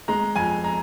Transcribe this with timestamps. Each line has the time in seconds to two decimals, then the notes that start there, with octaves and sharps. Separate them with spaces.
0.08 G#3 A#5
0.36 F2 G#5
0.64 A#5